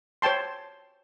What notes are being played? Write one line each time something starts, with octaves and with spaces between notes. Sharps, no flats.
C5 C#5 G5 A5 C6